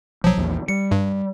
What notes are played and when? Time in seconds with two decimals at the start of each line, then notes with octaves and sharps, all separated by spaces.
0.24 B1 F3 F#3
0.37 A#1 E2 A#3
0.68 G3 C#7
0.91 G2